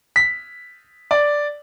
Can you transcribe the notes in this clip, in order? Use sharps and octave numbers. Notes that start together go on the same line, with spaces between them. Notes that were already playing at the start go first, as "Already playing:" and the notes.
B6
D5